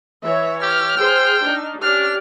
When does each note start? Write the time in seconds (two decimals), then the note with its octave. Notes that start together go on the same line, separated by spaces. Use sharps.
0.24 E3 C#5 E5
0.62 G4 F6
0.97 G#4 C5 G5
1.44 D4 D#4
1.82 C#4 D4 G4 D5 F6